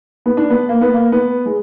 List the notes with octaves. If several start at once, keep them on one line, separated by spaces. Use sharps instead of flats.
B3
D4
B3
A#3
B3
A#3
B3
G#3